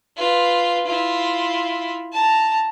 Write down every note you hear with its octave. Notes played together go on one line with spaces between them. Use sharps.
F4 B4
E4 F4
A5 A#5